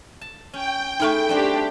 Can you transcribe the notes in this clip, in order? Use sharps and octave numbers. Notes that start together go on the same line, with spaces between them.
A5
C#4 G5
A3 D#4 E4 G#4 A4 C#6
G3 C4 D4 F#4 G4